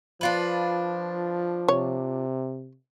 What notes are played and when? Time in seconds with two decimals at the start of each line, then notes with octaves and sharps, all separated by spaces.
0.21 F3 D4 F4 B4
1.68 C3 C#5